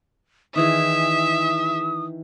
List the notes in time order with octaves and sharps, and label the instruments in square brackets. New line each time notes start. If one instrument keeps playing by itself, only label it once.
[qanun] D#3 E3 G#4 [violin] E5 [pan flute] D#6